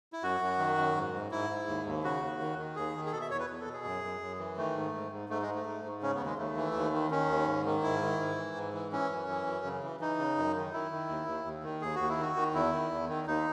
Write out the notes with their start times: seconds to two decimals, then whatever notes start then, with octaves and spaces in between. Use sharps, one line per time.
0.13 E4
0.23 F#2 F#4
0.40 F#2
0.59 D#3
0.77 F#2
0.95 G#2
1.14 G#2
1.31 G#2 E4
1.50 G#2
1.68 D#2
1.86 D#2
2.03 C#3 F#4
2.22 D#2
2.41 D#3
2.59 D#3
2.76 D#2 G#4
2.95 D#3
3.06 G#4
3.12 B2 A4
3.21 E5
3.31 E2 C#5
3.40 B4
3.48 E2
3.61 A4
3.68 B2
3.73 G#4
3.84 F#2
4.04 F#2
4.21 F#2
4.39 E3
4.57 D#3 A3
4.75 G#2
4.94 G#2
5.12 G#2
5.29 G#2 A3
5.42 G#3
5.48 G#2
5.55 A3
5.66 G#2
5.85 G#2
6.02 C#3 C#4
6.14 B3
6.20 D#2
6.26 G#3
6.38 D#2 A3
6.57 E3
6.74 D#2
6.93 D#3
7.11 D#3 C#4
7.29 D#2
7.47 G#2
7.66 D#3
7.83 G#2 E4
8.02 D#3
8.20 G#2
8.38 E3
8.55 G#2
8.73 E3
8.92 E3 C#4
9.10 F#2
9.29 E3
9.46 F#2
9.65 C#3
9.83 E3
10.00 E3 D#4
10.19 C#3
10.37 F#2
10.56 D#3
10.73 D#3 E4
10.91 D#3
11.09 D#2
11.27 D#2
11.45 D#2
11.63 D#3
11.82 D#2 G#4
11.95 D#2 F#4
12.09 E4
12.17 D#3 F#4
12.36 D#3
12.54 E2 E4
12.72 D#3
12.91 E2
13.09 D#3
13.27 D#2 D#4